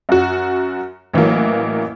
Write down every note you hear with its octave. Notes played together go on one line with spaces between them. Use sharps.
F#2 F#4
A1 E3 F#3 A#3